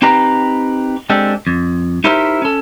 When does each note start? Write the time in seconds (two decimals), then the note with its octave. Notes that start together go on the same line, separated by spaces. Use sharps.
0.02 C4 D#4 G4 B4 A#5
1.10 G#3 C4 D4 G4 A4
1.47 F2
2.04 D#4 E4 G4 A#4 C5 E5
2.42 C#4 A4